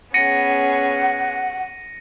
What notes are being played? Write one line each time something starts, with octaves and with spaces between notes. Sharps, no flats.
B3 C#4 G#4 F#5 A#6 C#7 D#7